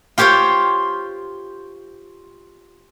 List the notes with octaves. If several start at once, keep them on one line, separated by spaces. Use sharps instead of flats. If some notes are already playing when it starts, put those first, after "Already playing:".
F4 G4 C5 C#5 G5